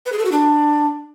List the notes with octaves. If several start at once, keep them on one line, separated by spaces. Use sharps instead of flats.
B4
G#4
A4
F#4
D4